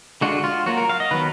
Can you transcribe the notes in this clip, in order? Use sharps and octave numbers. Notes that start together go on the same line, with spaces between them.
D3 G#3 D4 F4 F#4
F4
F#3 A#3 F4 F#4
A#4
F5
D#5
D#3 F#3 B3 B4